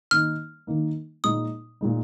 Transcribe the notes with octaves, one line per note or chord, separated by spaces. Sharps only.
D#3 A#3 D#4 F6
D#3 A#3 D#4
A#2 G#3 D#4 D#6
A#2 G#3 D#4